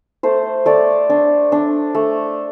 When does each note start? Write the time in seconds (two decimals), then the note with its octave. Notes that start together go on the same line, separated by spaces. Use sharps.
0.23 A3 C5
0.66 A3 D5
1.10 D4
1.52 D4
1.95 A3